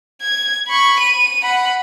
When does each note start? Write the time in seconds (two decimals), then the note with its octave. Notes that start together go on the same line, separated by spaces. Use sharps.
0.22 G#6
0.69 B5 C#6
1.00 D#7
1.43 F#5 B5